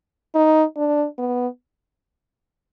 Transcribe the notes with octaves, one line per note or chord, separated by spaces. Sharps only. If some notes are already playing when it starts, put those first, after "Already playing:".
D#4
D4
B3